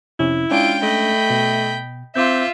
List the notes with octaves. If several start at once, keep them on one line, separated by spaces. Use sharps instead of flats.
F2 C3 C#4 E4
G#3 C#4 D4 F4 G5 D7
A3 D#5 B5
B2
C4 F4 E5 C6 D6 G6